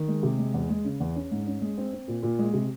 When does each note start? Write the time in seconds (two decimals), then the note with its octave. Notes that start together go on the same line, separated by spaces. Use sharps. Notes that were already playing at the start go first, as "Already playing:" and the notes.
Already playing: D#3
0.08 G#3
0.23 C3
0.39 G#3
0.54 E2
0.69 G#3
0.84 C#3
1.00 E2
1.16 C#4
1.31 G#2
1.47 C#4
1.61 G#3
1.78 C4
1.93 C4
2.08 A#2
2.23 A#2
2.39 G#3
2.53 C3